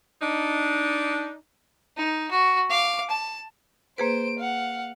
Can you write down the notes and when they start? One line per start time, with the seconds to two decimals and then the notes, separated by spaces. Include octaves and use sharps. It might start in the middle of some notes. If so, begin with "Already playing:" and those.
0.22 D4 D#4
1.97 D#4
2.31 F#4
2.70 F5 D6
3.10 A5
3.98 A#3 G#4 B4 C5 D7
4.39 F5 F#5